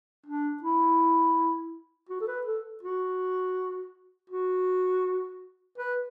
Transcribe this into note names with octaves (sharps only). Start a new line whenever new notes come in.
D4
E4
F#4
A4
B4
A4
F#4
F#4
B4